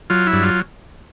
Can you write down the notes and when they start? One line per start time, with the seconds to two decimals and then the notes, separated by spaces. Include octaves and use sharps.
0.10 F#3 F4
0.27 E4
0.33 G2
0.43 F4